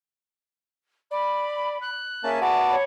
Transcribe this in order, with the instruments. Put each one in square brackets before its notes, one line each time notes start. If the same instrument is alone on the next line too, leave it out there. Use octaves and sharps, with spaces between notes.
[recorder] D5 [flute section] B5
[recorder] F#6
[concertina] A#3 C#4 A5 [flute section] G#4 E5
[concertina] B3 F#4 D5 [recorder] A5
[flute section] C#5 B5